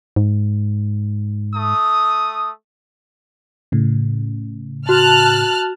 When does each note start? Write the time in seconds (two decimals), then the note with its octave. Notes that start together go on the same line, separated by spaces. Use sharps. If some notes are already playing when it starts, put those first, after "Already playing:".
0.16 G#2
1.55 A3 D#6
3.72 A2 C#3
4.89 F#4 A5 F6 F#6